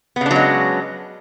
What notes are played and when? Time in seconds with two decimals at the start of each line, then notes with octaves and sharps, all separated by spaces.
0.16 B3
0.21 C#3
0.26 D4
0.31 F#3
0.35 G#3